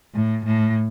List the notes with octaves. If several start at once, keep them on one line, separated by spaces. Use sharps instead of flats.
A2
A2